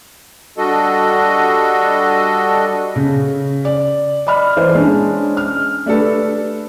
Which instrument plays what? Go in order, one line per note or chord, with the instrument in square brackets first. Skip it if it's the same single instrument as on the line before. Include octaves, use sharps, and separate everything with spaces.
[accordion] G3 D4 F#4 A4 D#5
[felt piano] C#3
D5
D5 D#5 B5 F6
E3 C5
G#3 C#4 D4
F6
[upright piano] A3 D4 G4 A4 B4